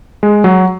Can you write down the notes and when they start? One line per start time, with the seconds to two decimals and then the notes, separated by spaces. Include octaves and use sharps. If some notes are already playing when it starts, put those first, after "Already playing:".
0.23 G#3
0.44 F#3